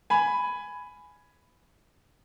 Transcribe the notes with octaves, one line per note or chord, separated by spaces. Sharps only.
G#5 B5